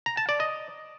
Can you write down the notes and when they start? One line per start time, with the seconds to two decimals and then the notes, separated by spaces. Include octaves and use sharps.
0.06 A#5
0.17 A5
0.29 D5
0.40 D#5